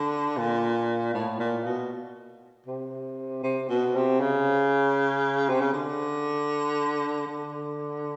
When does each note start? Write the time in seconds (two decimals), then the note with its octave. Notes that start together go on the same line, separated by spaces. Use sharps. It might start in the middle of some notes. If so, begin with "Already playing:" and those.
Already playing: D3
0.37 A#2
1.14 A2
1.39 A#2
1.64 B2
2.67 C3
3.43 C3
3.69 B2
3.95 C3
4.20 C#3
5.49 C3
5.61 C#3
5.74 D3
7.27 D3